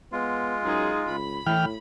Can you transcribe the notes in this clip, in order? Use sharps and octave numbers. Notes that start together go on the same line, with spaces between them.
G#3 B3 F4
F#2 D#4 G#4
C#2 B5
A2 E3 G5 F6